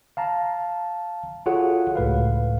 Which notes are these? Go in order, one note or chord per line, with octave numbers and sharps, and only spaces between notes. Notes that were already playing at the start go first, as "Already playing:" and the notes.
F5 A5 A#5
F4 F#4 G#4 A4 C#5 F#5
C#2 A2 B4 F5